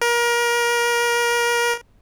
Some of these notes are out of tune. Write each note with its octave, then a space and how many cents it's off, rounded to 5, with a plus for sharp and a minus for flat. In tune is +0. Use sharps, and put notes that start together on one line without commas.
A#4 +30